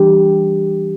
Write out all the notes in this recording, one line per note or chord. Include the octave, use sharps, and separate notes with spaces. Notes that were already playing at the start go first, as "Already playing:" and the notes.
Already playing: E3 G3 D4 G4